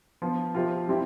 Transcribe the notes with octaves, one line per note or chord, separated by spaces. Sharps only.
F3 B3 F4
C3 F3 C4 F4
G3 C4 E4 G4